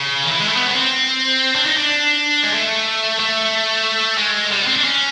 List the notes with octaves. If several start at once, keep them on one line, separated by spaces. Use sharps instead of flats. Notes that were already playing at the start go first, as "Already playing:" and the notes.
Already playing: C#3
D#3
E3
G#3
A3
B3
C#4
C4
D4
D#4
D4
G#3
A3
A3
G#3
G3
B3
C4
D4
C#4